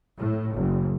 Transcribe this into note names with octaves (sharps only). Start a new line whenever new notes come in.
A2
F#1